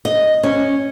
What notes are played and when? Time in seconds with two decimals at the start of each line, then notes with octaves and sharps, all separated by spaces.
0.05 D#5
0.43 C#4